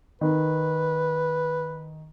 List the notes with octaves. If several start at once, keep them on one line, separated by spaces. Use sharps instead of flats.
D#3 B4